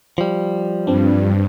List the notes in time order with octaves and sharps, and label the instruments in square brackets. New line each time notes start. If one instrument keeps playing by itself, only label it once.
[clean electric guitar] F3 G3
[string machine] G2 [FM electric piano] C4 D4